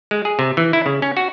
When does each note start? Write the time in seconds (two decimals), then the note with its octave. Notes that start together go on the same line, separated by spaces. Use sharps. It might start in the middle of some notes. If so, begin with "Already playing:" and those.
0.11 G#3
0.25 G#4
0.39 C3
0.57 E3
0.73 E4
0.86 C#3
1.02 C#4
1.17 F#4